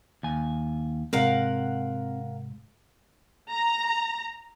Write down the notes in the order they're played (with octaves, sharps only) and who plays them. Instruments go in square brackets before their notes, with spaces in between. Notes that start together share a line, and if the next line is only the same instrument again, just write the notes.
[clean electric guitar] D#2 G#5
[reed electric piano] G#2 C3 G#3 [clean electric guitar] C4 [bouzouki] A#4 F5 F#5
[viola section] A#5